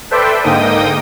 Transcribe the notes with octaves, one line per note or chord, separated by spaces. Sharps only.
A4 B4 C5 D5 E5 G5
G#2 D3 A#3 D#4 G5 D#6